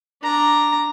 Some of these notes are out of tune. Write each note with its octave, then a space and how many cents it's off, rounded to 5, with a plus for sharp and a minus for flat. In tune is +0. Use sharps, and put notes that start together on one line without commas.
D4 +0 A#5 +0